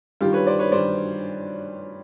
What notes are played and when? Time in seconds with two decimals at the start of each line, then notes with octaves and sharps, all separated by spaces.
0.21 G2 D#3 F4 G4
0.33 B4 C#5
0.47 C5 D5
0.59 B4 C#5
0.72 G2 D#3 C5 D5